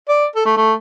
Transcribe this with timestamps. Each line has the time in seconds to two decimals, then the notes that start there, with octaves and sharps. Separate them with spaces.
0.09 D5
0.35 A4
0.45 A3
0.56 A3